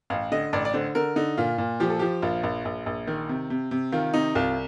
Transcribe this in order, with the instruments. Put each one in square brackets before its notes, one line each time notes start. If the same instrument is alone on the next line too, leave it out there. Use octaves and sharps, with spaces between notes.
[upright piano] A1 F5
D3 D#5
A1 D5
D5
D3 C5
D3 A#4
D3 D#4
A#2 F4
A#2
F3 G4
A4
F3 G4
A#1 F4
A#1
A#1
A#1
D#3
C3
C3
C3
D#3 F4
C3 D#4
C2 F4